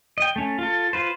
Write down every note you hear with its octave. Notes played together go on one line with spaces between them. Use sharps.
D#5 G5
A3 C#4
F4 A4
F4 B4 C5